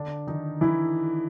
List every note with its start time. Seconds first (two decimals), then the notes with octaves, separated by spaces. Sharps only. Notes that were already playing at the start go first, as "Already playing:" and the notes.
Already playing: D3 D4
0.27 D#3 D#4
0.61 E3 E4